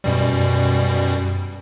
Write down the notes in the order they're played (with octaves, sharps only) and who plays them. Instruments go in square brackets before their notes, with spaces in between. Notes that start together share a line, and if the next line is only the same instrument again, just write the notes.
[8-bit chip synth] F#2 B2 G3